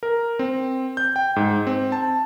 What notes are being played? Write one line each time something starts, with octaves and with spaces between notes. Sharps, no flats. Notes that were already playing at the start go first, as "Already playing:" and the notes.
A#4
C4
G6
G5
G#2
C4
A5